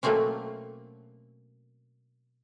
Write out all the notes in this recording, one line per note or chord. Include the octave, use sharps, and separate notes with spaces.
B2 F#3 A3 A#3 C4 C#4